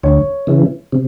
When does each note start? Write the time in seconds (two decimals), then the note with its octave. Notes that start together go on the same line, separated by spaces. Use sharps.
0.03 D2 C#5
0.47 C#3 E3
0.92 C3